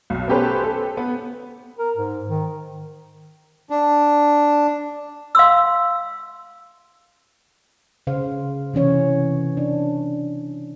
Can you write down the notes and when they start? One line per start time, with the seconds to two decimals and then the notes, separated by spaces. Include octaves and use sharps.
0.10 B1
0.28 B3 C#4 G4 A4 B4 C5
0.63 A4
0.97 B3
1.79 A#4
1.97 G#2
2.29 D#3
3.70 D4
5.35 F5 C6 E6
8.07 C#3 C5 F5
8.74 C3 E3 C#4 C#5
9.57 D4